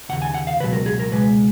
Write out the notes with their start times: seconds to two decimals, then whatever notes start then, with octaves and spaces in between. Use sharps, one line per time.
0.09 D#2 C#3 F#5
0.22 G#5
0.34 F#5
0.47 F5
0.60 C#2 B2 F#3 B4
0.73 A#4
0.86 G#4
1.00 A#4
1.11 C#2 B2 G#3 B4